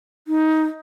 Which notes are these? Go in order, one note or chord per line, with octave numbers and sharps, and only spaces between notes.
D#4